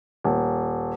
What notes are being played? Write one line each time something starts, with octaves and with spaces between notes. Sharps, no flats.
D#1